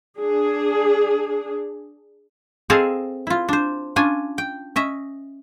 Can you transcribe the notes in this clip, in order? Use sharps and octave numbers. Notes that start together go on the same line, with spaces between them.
D4 G#4
C4 G#4 A4 D#5 F5
E4 F4
D4 C5
C#4 D4 F4 G#5
G5
C#4 D#5 E5